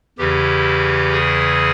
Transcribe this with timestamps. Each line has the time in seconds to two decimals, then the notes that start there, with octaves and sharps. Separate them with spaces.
0.18 E2 C#3 E3 G4
1.12 G#4